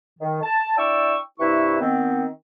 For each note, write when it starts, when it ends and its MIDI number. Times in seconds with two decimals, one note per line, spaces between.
0.20 0.40 51
0.42 0.73 81
0.77 1.15 62
0.77 1.15 64
0.77 1.15 74
0.77 1.15 79
0.77 1.15 85
0.77 1.15 88
1.40 1.77 43
1.40 1.77 48
1.40 1.77 64
1.40 1.77 71
1.40 1.77 76
1.40 1.77 85
1.81 2.26 51
1.81 2.26 59
1.81 2.26 60